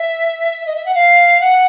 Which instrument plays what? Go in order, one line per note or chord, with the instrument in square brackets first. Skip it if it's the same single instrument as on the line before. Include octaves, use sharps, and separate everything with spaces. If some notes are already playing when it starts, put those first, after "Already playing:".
Already playing: [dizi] E5
D#5
E5
F#5
F5
F#5